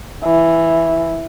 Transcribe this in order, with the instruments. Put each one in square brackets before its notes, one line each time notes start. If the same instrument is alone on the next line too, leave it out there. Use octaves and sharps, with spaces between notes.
[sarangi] E3